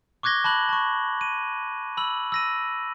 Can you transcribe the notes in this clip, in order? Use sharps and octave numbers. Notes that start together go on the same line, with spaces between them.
C#6 D6 F#6 G#6 A#6 G7
A5 B5 F#6 F#7
A5 C#6
D#7
B5 E6 F#7
E6 A#6 D#7